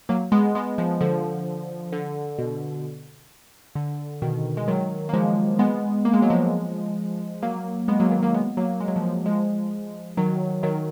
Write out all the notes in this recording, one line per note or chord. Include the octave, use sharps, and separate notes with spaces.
F#3 A#3
G#3 B3
G#3 B3
F3 G#3
D3 F3
D3
B2
D3
B2 D#3
G#3
D#3 F#3
A#3
F3 G#3
G#3 B3
A#3
G#3
F#3
F3 G#3
F#3 A#3
G#3 B3
F#3 A#3
D#3 F#3
F#3 A#3
G#3 B3
F#3 A#3
G#3
F#3
F3 G#3
F3 G#3
D#3 F#3
D#3 F#3